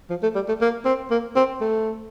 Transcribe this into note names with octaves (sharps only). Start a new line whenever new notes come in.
F3
A3
G3
A3
A#3
C4
A#3
C4
A3